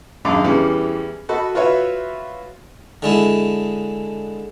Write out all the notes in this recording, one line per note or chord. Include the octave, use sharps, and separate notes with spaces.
G#1 F#2 G#3 D4 F5 D6
E2 E3 G3 C#4
F#4 A4 D#5 B5
F4 F#4 B4 C#5 E5
D3 G#3 E4